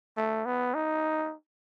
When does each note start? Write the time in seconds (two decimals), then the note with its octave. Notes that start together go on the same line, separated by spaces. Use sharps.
0.17 A3
0.46 B3
0.74 D#4